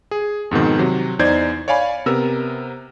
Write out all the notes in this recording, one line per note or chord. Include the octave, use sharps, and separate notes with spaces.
G#4
F2 G#2 B2 D#3
C3 F#3
E2 D#4 C5 D5 G6 G#6
C#5 D5 F5 G#5 B5
C3 B3 A#4 E6